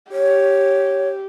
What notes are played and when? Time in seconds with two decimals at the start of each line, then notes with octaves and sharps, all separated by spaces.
0.12 G4 C#5